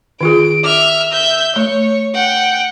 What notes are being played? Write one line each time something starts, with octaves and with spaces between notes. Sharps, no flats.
D#3 F4 G#4 D7
E5 D6 F6
E5 G6
A3 C#5
F#5 G5